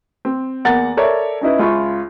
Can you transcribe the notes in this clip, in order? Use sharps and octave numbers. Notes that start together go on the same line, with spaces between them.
C4
E2 A#3 F#5 A#5 A6
A4 A#4 C#5 D5 E5
C#4 D#4 E4 B4
C#2 F4 E5 C#6